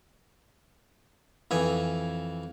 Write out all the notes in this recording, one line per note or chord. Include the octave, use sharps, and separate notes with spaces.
F2 E3 G#5